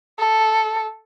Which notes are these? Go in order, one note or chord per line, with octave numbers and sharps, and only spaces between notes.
A4